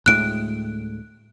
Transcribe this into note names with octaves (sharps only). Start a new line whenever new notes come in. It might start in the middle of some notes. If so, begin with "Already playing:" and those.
D2 A2 G#3 F#6 D7